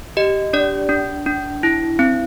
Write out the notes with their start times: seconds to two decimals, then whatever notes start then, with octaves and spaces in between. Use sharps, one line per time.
0.17 G4 D#5
0.53 D4 D5
0.89 D4
1.26 D4
1.63 E4
1.99 C4